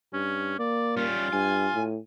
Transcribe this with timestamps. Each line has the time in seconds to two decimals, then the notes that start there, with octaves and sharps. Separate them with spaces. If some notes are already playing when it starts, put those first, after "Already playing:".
0.13 G2 C#4
0.59 A#3 D5
0.97 G3 C#4 F4
1.33 G2 G#5
1.74 A2